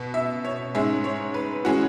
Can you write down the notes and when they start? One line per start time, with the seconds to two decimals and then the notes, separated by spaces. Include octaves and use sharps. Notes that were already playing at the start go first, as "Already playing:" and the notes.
Already playing: B2 B3
0.14 E5
0.45 C#5
0.75 G#2 G#3 C#4 E5
1.04 C#5
1.34 B4
1.65 E3 G#3 C#4 F#4